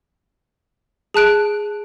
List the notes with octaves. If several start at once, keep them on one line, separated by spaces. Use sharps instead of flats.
G#4 A5 F#6 D7